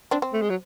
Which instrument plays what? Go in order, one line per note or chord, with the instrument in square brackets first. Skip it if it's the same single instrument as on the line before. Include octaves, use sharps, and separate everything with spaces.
[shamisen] C4 D4
C4
[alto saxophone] A3
G#3
F#3